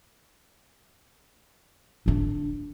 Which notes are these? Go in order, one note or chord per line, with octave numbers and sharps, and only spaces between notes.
D3 D4